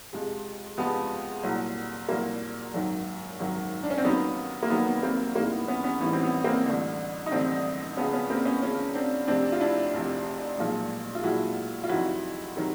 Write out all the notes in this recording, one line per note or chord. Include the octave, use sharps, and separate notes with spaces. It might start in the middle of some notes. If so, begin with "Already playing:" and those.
F2 C3 F3 G#3
F2 C3 F3 G#3 B3
C2 A#2 F#3
C2 A#2 F#3 A#3
G#1 F#2 D#3 F#3
G#1 F#2 D#3 F#3
D4
C#4
C4
D#2 D#3 F#3 B3
A#3
D#2 D#3 F#3 B3
B3
A#3 C4
A1 G#2 E3 G3 A#3
B3
B3 C#4
B3 C#4
A1 G#2 E3 G3 B3
C4
B3
A#3 C4
A1 G2 D3
D#4
A1 G2 D3 C4 D4
C#2 C#3 F3 B3 C#4
B3 C#4
A#3 C4
B3 C#4
C#2 C#3 F3 B3 C#4
C4 D4
F1 F2 C3 C4 D4
F4
D4 E4
F1 F2 C3
B1 A#2 F3 G#3
F4
B1 A#2 F3 G#3 E4 F#4
F4
F2 C3 D#3 F#3 E4 F#4
C3 D#3 F#3